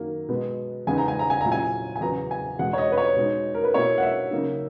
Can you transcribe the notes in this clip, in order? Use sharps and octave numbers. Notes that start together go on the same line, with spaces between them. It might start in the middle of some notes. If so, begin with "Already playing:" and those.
Already playing: F#2 D#3 F#3 A#3
B2 G#3 B3
E2 C#3 G#3 B3 D#4 G#5
A#5
G#5
A#5
G#5
A#2 F#3 C#4 E4 A#5
G#5
G#5
E2 C#3 F#3 B3 A#5
G#5
E2 B2 G#3 F#5
C#5
D#5
B4
C#5
B2 G#3 D#4
A#4
B4
B2 A#3 E4 C#5
F#5
E5
C#3 F#3 A#3 D#4